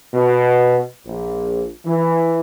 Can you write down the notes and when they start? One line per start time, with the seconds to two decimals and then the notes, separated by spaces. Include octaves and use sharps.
0.13 B2
1.05 A#1
1.86 E3